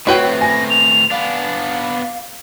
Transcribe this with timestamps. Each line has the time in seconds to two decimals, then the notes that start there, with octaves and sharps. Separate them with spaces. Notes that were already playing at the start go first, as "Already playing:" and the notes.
0.07 A2 C4 E4 F#4 B4 C#5 G5
0.41 G#5 A#6
0.70 F7
1.11 B3 D4 F5